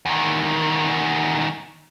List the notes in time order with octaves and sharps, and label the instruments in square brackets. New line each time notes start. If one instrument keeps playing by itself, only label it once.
[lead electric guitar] E2 D#3